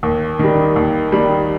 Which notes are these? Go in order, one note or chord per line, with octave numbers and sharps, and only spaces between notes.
D#2
D#3 G3
D#2
D#3 G3